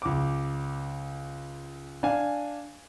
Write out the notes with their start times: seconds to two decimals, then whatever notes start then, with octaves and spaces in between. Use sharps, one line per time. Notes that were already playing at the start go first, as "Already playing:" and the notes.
0.02 C#2 D6
2.03 D4 F5 G#5